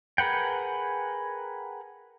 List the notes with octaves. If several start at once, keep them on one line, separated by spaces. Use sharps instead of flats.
G#4 A#4 B4 F#5 G5